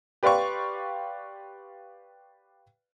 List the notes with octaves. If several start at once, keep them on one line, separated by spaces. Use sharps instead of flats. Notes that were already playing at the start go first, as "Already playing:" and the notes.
G4 B4 D5 F5 C6 C#6